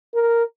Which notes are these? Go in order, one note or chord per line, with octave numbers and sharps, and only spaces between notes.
A#4